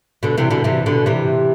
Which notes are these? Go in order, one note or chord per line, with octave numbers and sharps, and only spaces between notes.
B2 D3
C3 E3
B2 D3
C3 E3
B2 D3
C3 E3